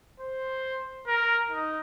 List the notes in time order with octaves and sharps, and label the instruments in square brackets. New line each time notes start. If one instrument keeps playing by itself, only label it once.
[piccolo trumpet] C5
A#4
D#4